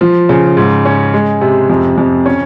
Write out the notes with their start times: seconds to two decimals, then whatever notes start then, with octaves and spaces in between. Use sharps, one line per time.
0.01 F3
0.29 C#3
0.57 G#2
0.85 C#4
1.13 G#3
1.41 C3
1.70 F2
1.98 F2
2.26 C#4